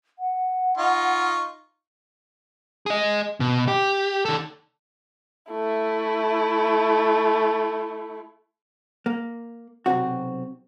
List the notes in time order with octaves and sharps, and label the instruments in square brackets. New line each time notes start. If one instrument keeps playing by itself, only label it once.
[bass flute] F#5
[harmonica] D#4 F4 C#6
[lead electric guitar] G#4 D#5
B2
G4
D#3 A4
[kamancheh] A3 E4
[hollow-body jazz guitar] A#3
B1 C3 C4 F#4